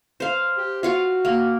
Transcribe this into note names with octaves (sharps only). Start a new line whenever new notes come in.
C5 F5
G4
F4 F#4 F5 C#6
A#3